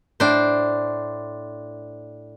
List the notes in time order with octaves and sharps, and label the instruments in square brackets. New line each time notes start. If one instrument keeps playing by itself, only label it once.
[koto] A2 D4 C5